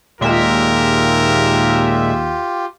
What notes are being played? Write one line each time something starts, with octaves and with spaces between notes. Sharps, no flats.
D#2 A#2 G#3 F4 G4 A#4 E5